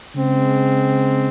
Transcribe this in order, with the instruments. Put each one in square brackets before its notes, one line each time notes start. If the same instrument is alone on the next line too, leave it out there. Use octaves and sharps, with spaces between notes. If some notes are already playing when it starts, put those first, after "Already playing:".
[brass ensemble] C#3 G#3 C4